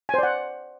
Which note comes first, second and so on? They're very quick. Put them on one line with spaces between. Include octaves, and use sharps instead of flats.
G#5 C5 D5 F#5